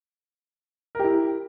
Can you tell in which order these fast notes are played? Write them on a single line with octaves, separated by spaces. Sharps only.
A#4 G4 E4